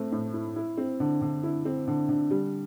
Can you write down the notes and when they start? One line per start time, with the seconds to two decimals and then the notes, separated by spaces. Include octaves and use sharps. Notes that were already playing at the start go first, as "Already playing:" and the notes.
Already playing: A2 A3 C4
0.12 A2
0.34 E4
0.56 E4
0.77 C4
1.00 D3
1.22 D3
1.43 E4
1.65 C4
1.88 D3
2.09 D3
2.31 G3